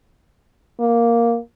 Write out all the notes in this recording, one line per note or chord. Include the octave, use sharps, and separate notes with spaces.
A#3